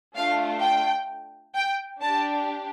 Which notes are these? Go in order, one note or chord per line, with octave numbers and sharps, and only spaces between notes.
A3 D4 F4 F5
G5
G5
D4 G4 A5